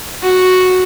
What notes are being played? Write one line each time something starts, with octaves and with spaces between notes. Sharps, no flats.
F#4